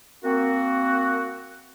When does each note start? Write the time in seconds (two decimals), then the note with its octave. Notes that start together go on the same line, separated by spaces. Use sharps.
0.24 A#3 C4 F#4